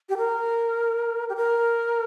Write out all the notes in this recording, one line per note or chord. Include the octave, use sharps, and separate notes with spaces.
G4
A#4
G4
A#4